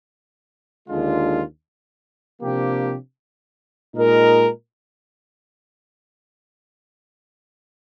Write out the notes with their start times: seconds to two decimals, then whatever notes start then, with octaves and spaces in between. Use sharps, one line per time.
0.88 D#2 D3 G#3 D4 F4
2.42 C3 F3 A#3 D4 G4
3.94 A#2 G#3 D#4 A#4